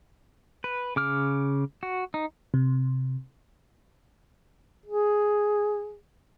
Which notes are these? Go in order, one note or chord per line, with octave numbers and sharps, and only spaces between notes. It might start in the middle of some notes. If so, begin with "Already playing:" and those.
B4
C#3 D6 F6
F#4
D#4
C3
G#4